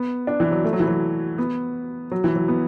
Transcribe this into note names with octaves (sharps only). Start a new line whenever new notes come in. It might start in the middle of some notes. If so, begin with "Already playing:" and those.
Already playing: B3
D4
E3
F#3
A3
F#3
E3
F#3
B3
F#3
E3
F#3
B3